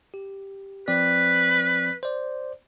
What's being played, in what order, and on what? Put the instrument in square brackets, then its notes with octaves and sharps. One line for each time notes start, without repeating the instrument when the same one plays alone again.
[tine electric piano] G4
[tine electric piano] F3 C4 D5 [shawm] B4
[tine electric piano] C5 D5